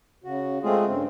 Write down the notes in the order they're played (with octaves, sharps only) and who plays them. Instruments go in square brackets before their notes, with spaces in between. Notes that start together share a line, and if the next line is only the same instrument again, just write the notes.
[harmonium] C#3 F#4
G#3 A3 C4 F4 G#4
G2 C#3 C4